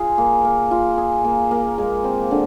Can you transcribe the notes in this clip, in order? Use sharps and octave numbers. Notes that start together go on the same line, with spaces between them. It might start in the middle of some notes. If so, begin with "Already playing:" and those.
Already playing: F4 G#4
A#3
A#3
F4
G#4
A#3
A#3
G#3
C4
D3